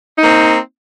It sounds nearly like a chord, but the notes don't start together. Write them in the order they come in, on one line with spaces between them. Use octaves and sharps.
D#4 A#3 C4